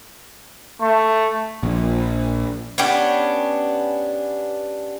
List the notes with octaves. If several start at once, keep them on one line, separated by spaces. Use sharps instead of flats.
A3 C#6
A#1
B3 C#4 D4 G4